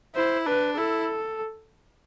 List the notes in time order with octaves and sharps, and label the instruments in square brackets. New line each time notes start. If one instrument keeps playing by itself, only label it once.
[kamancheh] E4 [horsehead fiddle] C5
[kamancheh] D4 [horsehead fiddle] B4
[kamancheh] E4 [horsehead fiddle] A4